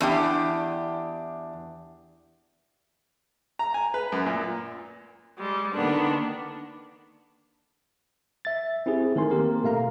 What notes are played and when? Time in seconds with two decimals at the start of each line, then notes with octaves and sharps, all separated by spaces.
0.01 E2 D4 G4
3.59 A#5
3.74 G#5
3.94 B4
4.12 F#2
4.26 A#2
5.38 G3 G#3
5.74 D3 D#3 A#3 B3 D4
8.45 E5 A6
8.86 C4 E4 G4 G#4
9.16 D#3 A3 A#4 G#5 C6
9.31 A#3 C4 G4 A#4
9.64 B2 A3 F5 A#5